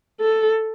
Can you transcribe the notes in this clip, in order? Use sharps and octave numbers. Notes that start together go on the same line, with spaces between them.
A4